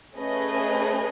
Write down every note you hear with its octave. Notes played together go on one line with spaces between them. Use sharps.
A3 C#4 G#4 B4 D#5